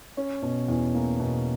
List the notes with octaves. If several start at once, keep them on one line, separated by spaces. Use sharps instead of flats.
C#4
B2
E2
A#3
B2